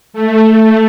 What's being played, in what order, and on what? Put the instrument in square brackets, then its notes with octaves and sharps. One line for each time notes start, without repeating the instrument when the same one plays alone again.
[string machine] A3